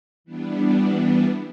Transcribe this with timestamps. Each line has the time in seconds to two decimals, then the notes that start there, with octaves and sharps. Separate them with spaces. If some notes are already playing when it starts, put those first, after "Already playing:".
0.24 E3 G3 B3 D4